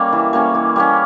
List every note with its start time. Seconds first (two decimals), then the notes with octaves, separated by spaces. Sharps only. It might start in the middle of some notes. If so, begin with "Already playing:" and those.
Already playing: G3 A#3 C#4
0.13 E3
0.33 G3 A#3 C#4
0.54 E3
0.76 G3 A#3 C#4